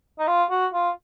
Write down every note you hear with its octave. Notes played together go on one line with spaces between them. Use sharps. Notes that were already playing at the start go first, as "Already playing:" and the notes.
D#4
F4
F#4
F4